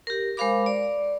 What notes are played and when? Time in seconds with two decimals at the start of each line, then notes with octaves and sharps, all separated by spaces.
0.07 G4 A#4
0.37 G#3 A#4 C5 F5 B5 D6
0.66 D5